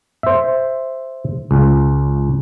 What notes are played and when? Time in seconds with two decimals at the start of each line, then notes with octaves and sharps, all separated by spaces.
0.23 C5 E5
1.51 C#2